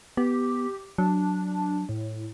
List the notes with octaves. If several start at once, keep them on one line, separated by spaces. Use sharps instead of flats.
B3 G4
F#3 D4
A2